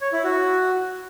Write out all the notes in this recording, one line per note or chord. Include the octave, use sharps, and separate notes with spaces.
C#5
E4
F#4